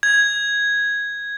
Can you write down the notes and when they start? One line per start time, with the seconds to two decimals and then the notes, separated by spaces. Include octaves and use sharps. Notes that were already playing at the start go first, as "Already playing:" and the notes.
0.03 G#6